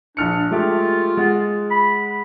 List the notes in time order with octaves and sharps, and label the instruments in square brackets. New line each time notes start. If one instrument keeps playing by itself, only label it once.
[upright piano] A#1 F6 C#7 [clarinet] D4
[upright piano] G#3 A3 G4 [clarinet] F4
[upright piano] G#3 F#5
[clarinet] B5